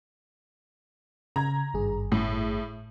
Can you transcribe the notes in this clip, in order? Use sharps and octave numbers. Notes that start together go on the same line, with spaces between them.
C#3 A#5 G#6
G#1 G2 G#4
A2